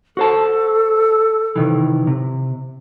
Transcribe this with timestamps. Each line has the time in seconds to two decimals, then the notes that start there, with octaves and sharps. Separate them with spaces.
0.17 F#4 A4 C5 A5
1.56 C3 D#3 E3
2.07 C3